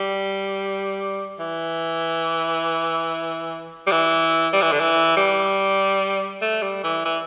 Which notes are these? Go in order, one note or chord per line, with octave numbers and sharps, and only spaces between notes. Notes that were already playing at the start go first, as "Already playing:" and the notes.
Already playing: G3
E3
G3
E3
G3
E3
D3
E3
G3
A3
G3
E3
E3